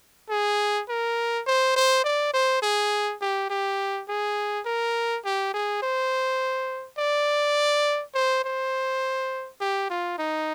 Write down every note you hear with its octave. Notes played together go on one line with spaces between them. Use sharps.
G#4
A#4
C5
C5
D5
C5
G#4
G4
G4
G#4
A#4
G4
G#4
C5
D5
C5
C5
G4
F4
D#4